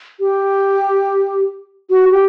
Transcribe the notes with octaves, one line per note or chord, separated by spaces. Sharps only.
G4
F#4
G4